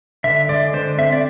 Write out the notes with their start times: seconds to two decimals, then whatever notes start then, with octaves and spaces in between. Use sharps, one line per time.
0.24 D3 E5
0.49 G#3 D5
0.74 D3 C5
0.98 C4 E5
1.12 D5